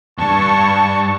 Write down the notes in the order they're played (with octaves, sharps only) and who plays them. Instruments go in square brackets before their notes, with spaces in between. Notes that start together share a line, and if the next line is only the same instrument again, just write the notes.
[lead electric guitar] E2 G2 [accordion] A5 C#6